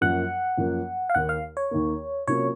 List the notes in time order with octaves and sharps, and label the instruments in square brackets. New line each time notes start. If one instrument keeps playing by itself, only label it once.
[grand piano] F#2 F3 A#3 C#4 [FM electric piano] F#5
[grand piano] F#2 F3 A#3 C#4
[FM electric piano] F5
[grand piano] D#2 D#3 A#3 [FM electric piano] F#5
[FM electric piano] F5
C#5
[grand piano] D#2 D#3 A#3
[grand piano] C3 F#3 A#3 C#4 F4 [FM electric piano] C#5